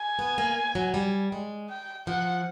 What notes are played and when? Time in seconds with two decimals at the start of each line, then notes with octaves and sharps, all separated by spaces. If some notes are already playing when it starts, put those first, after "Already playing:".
Already playing: G#5
0.19 B3
0.38 A#3
0.75 F#3
0.94 G3
1.32 G#3
1.70 G5
2.07 F3 F#5